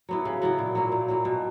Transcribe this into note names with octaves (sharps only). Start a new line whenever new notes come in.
F#3 B3 E4
C#3
F#3 B3 E4
A#2
F#3 A#3 E4
A#2
F#3 A#3 E4
B2